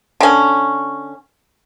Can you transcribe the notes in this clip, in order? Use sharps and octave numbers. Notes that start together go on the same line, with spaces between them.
D3 C#4